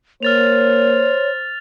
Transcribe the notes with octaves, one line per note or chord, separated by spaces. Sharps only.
A#3 C5 C#5 F6 A6 F7